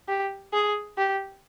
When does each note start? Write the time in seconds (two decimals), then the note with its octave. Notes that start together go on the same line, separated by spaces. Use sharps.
0.08 G4
0.53 G#4
0.98 G4